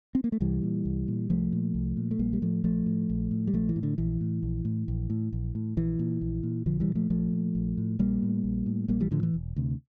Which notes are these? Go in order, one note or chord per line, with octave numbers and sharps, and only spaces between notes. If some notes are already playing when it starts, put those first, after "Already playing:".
C4
A#3
A3
C2 E3 G3
A#2
C2
A#2
C2 F3 A3
A#2
C2
A#2
A3
A#1 G3 A#3
G3
A2 F3 A3
A#1 F3 A3
A2
A#1
A2
G3
A#1 F3 A3
E3
A2
D3
A#1 E3
A2
A#1
A2
A#1
A2
A#1
A2
A#1 E3
A#2
A#1
A#2
A#1 D3 F3
E3 G3
A#2
F3 A3
A#1 F3 A3
A#2
A#1
A2
A#1 G3 A#3
A2
A#1
A2
A#1 G3 A#3
E3 G3
A2 D3 F3
E3
E1
D2 C3